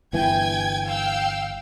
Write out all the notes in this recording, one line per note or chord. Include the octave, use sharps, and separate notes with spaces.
G1 E3 G5 G#5 G#6
F5 G5 E6